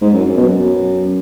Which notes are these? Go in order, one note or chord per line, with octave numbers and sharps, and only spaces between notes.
G#2
F#2
F#2
B2
F#2